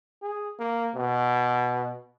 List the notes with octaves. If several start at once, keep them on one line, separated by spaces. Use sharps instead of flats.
G#4
A#3
B2